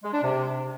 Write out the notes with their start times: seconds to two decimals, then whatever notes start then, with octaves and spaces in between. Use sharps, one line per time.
0.03 G#3
0.13 D4
0.22 C3